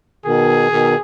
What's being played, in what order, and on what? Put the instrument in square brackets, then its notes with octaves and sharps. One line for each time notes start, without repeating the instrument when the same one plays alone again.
[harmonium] B2 D#3 [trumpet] G#4
[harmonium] B2 D#3